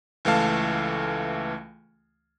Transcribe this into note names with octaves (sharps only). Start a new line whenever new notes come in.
C#2 E3 A3 F5 A5